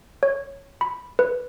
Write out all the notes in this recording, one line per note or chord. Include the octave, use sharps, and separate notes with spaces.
C#5
B5
B4